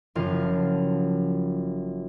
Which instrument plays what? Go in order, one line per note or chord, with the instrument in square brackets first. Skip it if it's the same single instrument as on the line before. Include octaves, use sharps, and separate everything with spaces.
[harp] F#1 F3 F4